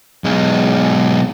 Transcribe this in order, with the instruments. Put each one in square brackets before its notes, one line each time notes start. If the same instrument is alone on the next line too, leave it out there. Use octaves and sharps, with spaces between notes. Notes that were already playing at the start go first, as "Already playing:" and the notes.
[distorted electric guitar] B1 G#3